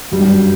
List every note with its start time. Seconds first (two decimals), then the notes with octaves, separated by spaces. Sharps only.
0.12 F#2 G3
0.19 G2
0.26 F#2